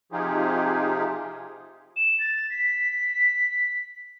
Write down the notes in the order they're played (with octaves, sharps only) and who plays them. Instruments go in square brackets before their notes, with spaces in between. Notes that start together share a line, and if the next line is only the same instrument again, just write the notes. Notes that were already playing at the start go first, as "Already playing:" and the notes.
[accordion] C3 F3 D#4 F4 G4 G#4
[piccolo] E7
A6
B6